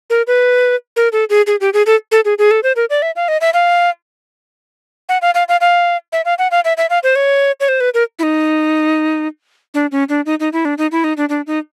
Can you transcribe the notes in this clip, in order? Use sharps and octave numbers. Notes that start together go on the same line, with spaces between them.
A#4
B4
A#4
A4
G#4
G#4
G4
G#4
A4
A4
G#4
G#4
A4
C5
A#4
D5
E5
F5
D#5
E5
F5
F#5
F5
F5
F5
F5
E5
F5
F#5
F5
E5
E5
F5
C5
C#5
C#5
C5
B4
A#4
E4
D#4
D4
C#4
D4
D#4
D#4
E4
D4
D#4
E4
D#4
D4
D4
D#4